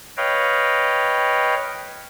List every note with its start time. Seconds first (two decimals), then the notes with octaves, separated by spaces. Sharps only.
0.17 B4 C#5 D#5 F5 G5